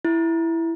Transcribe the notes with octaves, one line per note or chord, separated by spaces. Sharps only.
E4